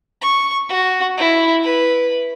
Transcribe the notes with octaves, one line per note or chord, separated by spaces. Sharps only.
C#6
F#4
E4
B4